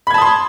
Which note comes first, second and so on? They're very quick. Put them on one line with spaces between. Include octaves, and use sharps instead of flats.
B5 G#6 A5 D#6 C6